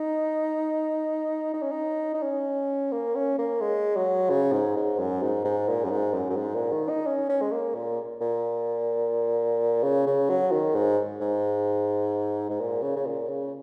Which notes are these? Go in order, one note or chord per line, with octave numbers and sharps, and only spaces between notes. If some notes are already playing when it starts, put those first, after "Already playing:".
Already playing: D#4
D#4
C#4
D#4
D#4
C#4
A#3
C#4
A#3
G#3
F#3
C#3
G#2
G#2
F#2
G#2
G#2
A#2
F#2
G#2
F#2
F#2
G#2
A#2
D#3
D#4
C#4
C#4
G#3
A#3
A#2
A#2
C#3
C#3
F#3
D#3
G#2
G#2
G#2
A#2
C#3
C#3
A#2
C#3